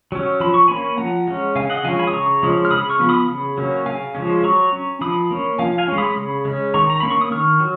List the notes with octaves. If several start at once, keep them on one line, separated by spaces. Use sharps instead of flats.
F#3 C#4
F3 B5
C#6
A#3 C#4 G#5 B5
F3 F#5 A#5
G#3 C#4
C#3 F5 G#5
D#5 F#5
F3 G#3 C#4 F5 G#5
G#5 B5
D#6
C#3 A#5 C#6
F3 G#3 C#4
F6
C#3 B5 D#6
C#6 F6
F3 B3
B5 D#6
C#3
F#3 A#3 C#4
C#3 F5 G#5
F3 G#3 C#4
F#3 A#5 C#6
C#4
F3 B5 D#6
A#3 C#4
F3 F5 G#5
F5 G#5
G#3 C#4
B5 D#6
C#3
G#3 C#4
D#3 A#5 C#6
A#5
A#3 C#4 B5
C#6
D#6
D#3 C#6 F6
F#3